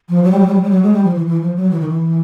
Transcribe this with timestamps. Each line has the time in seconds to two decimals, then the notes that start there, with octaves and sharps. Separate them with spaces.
0.09 F3
0.24 F#3
0.32 G3
0.39 F#3
0.47 G3
0.54 F#3
0.62 G3
0.70 F#3
0.83 G#3
0.94 G3
1.04 F3
1.15 E3
1.27 E3
1.41 F3
1.56 F#3
1.71 E3
1.80 D#3
1.88 E3